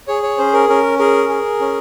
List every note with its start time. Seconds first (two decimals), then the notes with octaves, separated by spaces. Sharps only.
0.08 G#4 C#5
0.23 C#5
0.38 C#4 C5
0.53 A#4
0.69 C#4 A#4
0.99 G#4 A#4
1.29 G#4
1.60 C#4